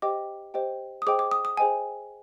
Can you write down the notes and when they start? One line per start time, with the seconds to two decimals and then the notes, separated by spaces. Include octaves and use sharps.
0.02 G4 C5 D#5 G5 D6
0.54 G4 C5 D#5 G5
1.02 D#6
1.07 G#4 C5 D#5 G5 D6
1.19 D6
1.31 D#6
1.45 D#6
1.57 G#4 C5 D#5 G5 G#5